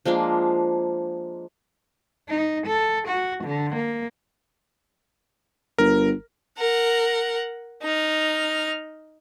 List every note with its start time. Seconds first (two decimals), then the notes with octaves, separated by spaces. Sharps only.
0.05 F3 G#3 A#3 D4
2.29 D#4
2.67 A4
3.08 F#4
3.44 D3
3.75 A#3
5.78 G1 A#4
6.58 A#4 F#5
7.83 D#4 F6